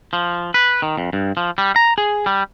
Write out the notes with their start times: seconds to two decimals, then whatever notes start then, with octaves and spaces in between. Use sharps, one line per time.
0.13 F3
0.54 B4
0.82 D#3
0.97 F2
1.13 G2
1.37 F3
1.58 G3
1.76 A#5
1.98 G#4
2.26 G3